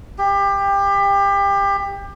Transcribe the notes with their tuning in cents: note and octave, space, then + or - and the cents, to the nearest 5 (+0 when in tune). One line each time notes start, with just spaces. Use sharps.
G4 +25